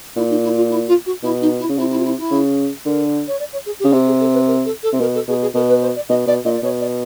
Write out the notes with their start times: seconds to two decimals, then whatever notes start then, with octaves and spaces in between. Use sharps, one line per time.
0.16 A#2 E4
0.30 D#4
0.43 E4
0.56 F4
0.69 E4
0.87 F4
1.06 F#4
1.23 B2 E4
1.41 D#4
1.59 E4
1.69 C#3
1.77 C3 E4
1.90 E4
1.98 F4
2.04 E4
2.18 E4
2.31 C#3
2.85 D3 A#4
3.27 C#5
3.39 D5
3.53 C#5
3.66 G#4
3.79 G4
3.84 C#3
3.92 C3 G4
4.06 G#4
4.20 A4
4.33 B4
4.47 A#4
4.65 A4
4.83 A4
4.92 C3
5.00 B2 A#4
5.15 A4
5.28 B2 G#4
5.42 G#4
5.54 B2 A#4
5.69 B4
5.82 C5
5.96 D5
6.09 B2 D#5
6.27 B2 D5
6.44 A#2 D#5
6.54 D5
6.63 B2 C#5
6.80 D5